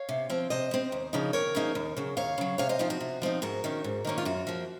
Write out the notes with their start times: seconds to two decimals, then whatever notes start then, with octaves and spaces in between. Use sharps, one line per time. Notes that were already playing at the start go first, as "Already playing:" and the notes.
Already playing: C#5 F5
0.09 C3
0.30 F3 C4
0.50 C3 C5 D#5
0.71 F3 C4
0.92 D#2
1.13 C#3 F3 A#3 D#4
1.33 D#2 A#4 C#5
1.55 C#3 F3 A#3 D#4
1.75 D#2
1.97 C#3 F#3
2.17 D#2 C#5 F5
2.38 C#3 F#3
2.58 C3 C#5 F5
2.69 C5 D#5
2.79 F3 C4 D#4 F4
2.90 F#4
3.00 C3
3.22 F3 C4 D#4
3.42 G#2 F#4 A#4
3.64 D#3 A#3 C#4
3.84 G#2
4.05 D#3 A#3 C#4
4.18 F4
4.25 F#2 F#4
4.47 F3 A#3